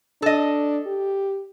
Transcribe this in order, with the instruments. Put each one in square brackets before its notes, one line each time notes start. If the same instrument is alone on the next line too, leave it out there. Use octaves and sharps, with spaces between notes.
[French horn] D4 [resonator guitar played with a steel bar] A4 D#5
[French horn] G4